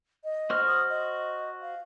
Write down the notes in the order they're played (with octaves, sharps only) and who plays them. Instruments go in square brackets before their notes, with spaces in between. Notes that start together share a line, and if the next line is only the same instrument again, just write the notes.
[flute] D#5
[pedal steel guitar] F#4 C5 F6
[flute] D#6
D#5
F5